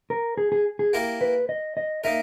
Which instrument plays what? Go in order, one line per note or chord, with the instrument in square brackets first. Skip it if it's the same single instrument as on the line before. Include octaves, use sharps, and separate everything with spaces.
[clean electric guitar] A#4
G#4
G#4
G#4
[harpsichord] A#3 E4 G4 A#4
[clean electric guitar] B4
D#5
D#5
[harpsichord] A#3 D#4 A#4 [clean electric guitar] E5